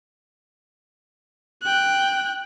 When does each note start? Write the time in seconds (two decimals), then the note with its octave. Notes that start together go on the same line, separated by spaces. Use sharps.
1.63 G5 F#6